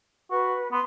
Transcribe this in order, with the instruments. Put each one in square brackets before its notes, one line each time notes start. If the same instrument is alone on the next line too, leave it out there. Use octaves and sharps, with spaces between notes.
[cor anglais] F#4 [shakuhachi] B4
[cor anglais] B3 [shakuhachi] C6